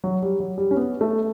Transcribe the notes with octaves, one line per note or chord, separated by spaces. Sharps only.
F#3
G3
F#3
G3
C#4
B3
A3